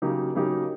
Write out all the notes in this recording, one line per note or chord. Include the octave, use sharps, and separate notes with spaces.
C#3 F#3 A#3 D#4 G4
C#3 F#3 A#3 D#4 G4